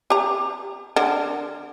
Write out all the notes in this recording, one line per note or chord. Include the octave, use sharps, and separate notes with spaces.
G4 A#5
D3 A#4